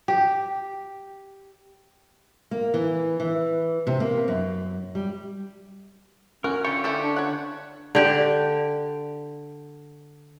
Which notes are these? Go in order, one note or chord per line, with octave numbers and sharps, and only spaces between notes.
G4
A#3
E3
E3
C3
A#3
F#2
G3
C#4 F#4 A#4
D3 F4 G4 C#6
E4 G4 A4
D4
C#5 F#5
D3 G4